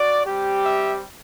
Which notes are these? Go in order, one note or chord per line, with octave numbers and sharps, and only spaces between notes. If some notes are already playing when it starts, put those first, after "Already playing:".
Already playing: F#4 D5
G3 C4 G4
E5